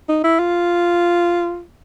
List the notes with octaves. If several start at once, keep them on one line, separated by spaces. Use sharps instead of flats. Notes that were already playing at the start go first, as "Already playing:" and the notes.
D#4
E4
F4